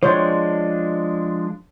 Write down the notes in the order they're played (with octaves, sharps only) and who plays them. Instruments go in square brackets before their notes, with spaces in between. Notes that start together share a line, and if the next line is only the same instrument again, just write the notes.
[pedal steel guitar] F3 G#3 D4 [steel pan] C5 C#5